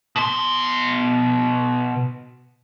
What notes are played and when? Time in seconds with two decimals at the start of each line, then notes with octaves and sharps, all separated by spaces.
0.16 B2 C6